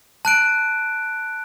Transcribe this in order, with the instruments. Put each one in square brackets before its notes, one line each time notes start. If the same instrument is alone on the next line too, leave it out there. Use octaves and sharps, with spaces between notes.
[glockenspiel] A5 F#6 D7